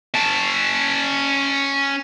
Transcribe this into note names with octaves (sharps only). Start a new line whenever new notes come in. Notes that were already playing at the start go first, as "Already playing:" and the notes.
C#4 A5